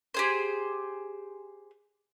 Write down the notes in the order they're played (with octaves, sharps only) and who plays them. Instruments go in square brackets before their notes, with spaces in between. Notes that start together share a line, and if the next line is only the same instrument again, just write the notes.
[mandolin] G4 G#4 C5